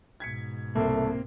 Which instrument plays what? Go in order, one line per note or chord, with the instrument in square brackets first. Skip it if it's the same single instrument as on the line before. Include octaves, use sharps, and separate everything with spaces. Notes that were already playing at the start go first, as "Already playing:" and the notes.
[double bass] G#2 B2 [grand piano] G#6 B6 C#7
[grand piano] C2 [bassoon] A3 [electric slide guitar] A#3 C4